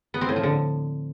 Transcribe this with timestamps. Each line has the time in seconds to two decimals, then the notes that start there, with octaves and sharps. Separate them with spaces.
0.14 B3
0.21 C4
0.29 A2
0.36 F3
0.43 D3